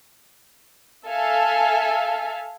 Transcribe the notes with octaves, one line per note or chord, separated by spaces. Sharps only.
A4 E5 F5 G#5